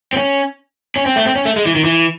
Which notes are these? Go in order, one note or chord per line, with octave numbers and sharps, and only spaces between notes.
C4
C#4
C#4
C4
A3
C4
C#4
A3
G#3
E3
D#3
E3